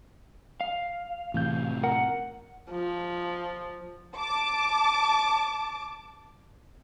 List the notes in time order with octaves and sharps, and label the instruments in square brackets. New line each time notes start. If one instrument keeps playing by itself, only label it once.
[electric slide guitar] F5
[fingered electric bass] A2 C3 [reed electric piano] E3 G6
[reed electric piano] A#4 [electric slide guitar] F#5
[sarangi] F3
[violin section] A5 D6